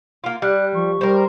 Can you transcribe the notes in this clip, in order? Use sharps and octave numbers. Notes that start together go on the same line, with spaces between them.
A#3 F4
G3 D5 F#6
F3 C#6
G3 A#4 C5